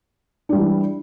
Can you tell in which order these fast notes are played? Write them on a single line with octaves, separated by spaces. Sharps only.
D4 G3 E3 E4